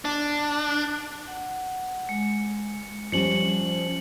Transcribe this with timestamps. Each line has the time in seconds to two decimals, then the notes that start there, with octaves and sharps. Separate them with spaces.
0.05 D4
1.28 F#5
2.09 G#3 C#7
3.12 F3 G3 C#4 C5 C#7 F#7